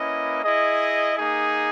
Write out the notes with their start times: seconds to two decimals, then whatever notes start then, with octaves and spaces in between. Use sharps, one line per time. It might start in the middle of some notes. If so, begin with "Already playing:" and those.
Already playing: A#3 C#4 E4 B4 D#5
0.43 E4 G#4 D#5
1.14 A#3 D#4 G#4